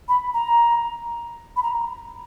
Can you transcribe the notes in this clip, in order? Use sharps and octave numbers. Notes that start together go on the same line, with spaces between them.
B5
A#5
B5
A#5